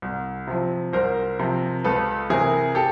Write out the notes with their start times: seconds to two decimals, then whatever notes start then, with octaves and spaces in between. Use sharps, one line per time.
0.02 C2
0.47 C3 F3
0.93 C2 A#4 C5
1.39 C3 F3
1.84 C#2 A4 B4
2.30 C3 E3 G#4 A#4
2.75 G4 A4